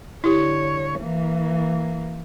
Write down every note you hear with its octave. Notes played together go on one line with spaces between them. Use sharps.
D3 E4 G4 C#5
E3 A#3